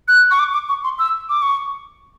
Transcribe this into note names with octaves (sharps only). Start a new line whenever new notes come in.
F#6
C#6
D6
D6
C#6
C6
E6
D6
C#6